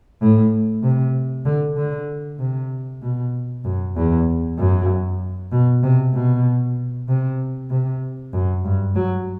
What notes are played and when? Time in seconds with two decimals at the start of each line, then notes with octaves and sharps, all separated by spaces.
0.21 A2
0.83 C3
1.45 D3
1.77 D3
2.39 C3
3.02 B2
3.65 F#2
3.96 E2
4.58 F#2
5.52 B2
5.83 C3
6.14 B2
7.08 C3
7.71 C3
8.33 F#2
8.64 G2
8.96 F#3